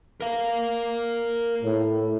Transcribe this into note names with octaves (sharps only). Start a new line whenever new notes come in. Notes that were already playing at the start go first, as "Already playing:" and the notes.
A#4 F5
A2